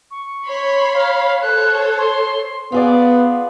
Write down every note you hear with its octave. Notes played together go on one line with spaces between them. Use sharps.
C#6
C#5 B5 C6
F5
A4 C5 C#5 F#6
C6
B3 F4 G#4 D5